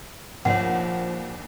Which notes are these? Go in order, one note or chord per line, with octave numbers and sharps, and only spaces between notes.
A#1 D#2 F3 C#5 F#5